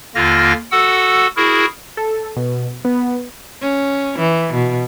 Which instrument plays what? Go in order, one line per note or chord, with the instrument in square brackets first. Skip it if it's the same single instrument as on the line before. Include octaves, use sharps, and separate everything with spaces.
[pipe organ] D#2 D3 A#3 F4 F6 A#6
F#4 A4 F#5 E6
E4 F#4 G#4 A#4
[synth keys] A4
B2
B3
[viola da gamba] C#4
E3
B2